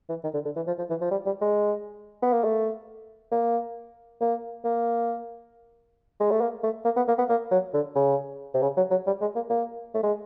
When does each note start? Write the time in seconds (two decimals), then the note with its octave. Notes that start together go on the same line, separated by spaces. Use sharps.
0.09 E3
0.24 D#3
0.34 D3
0.45 D3
0.56 E3
0.67 F3
0.78 F3
0.90 E3
1.01 F3
1.11 G3
1.26 G3
1.42 G#3
2.22 B3
2.33 A#3
2.44 A3
3.32 A#3
4.21 A#3
4.65 A#3
6.20 G#3
6.31 A3
6.41 A#3
6.63 A3
6.85 A#3
6.97 B3
7.08 A#3
7.19 B3
7.29 A#3
7.51 F#3
7.74 D3
7.95 C#3
8.54 C3
8.62 C#3
8.77 F#3
8.91 F#3
9.06 G3
9.21 G#3
9.36 A#3
9.50 A#3
9.95 A3
10.03 G#3